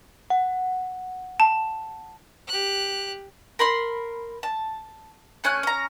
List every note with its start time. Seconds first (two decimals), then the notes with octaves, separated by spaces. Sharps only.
0.30 F#5
1.40 A5
2.48 G4 F#6
3.59 A#4 B5 C6
4.43 A5
5.44 A3 C#4 G#5 F#6
5.63 C#4 A#5